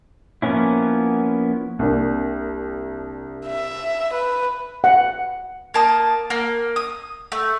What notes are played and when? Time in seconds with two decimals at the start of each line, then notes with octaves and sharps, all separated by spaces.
0.42 F3 A#3 B3 C#4 E4
1.79 C2 A#3 D4
3.46 E5
4.13 B4
4.84 F#5
5.74 A#3 A5 D#6
6.30 A#3
6.76 D#6
7.32 A3